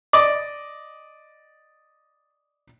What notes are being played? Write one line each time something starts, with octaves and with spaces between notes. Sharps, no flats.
D5 D#5